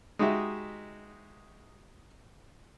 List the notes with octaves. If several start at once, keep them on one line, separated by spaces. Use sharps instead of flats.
G#3 D#4 F#4 G4 E5